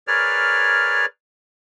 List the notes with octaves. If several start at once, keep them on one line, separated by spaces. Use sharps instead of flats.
G#4 A#4 B4 C#5 D5 F6